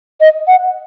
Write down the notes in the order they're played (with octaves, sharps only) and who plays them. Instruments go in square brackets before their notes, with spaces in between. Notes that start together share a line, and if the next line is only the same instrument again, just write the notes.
[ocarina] D#5
F#5